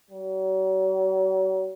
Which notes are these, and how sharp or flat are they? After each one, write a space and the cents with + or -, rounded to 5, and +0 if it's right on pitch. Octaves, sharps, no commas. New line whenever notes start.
F#3 +40